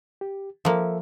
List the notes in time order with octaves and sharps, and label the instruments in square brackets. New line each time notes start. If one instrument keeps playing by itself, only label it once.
[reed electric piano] G4
[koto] F3 A#3 [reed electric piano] A4 A#4 E5